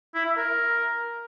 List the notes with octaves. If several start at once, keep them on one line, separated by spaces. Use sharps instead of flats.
E4
E5
A#4